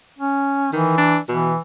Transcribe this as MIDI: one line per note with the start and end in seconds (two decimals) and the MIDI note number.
0.18 0.73 61
0.73 0.96 51
0.73 1.17 52
0.98 1.18 62
1.28 1.53 47
1.28 1.58 52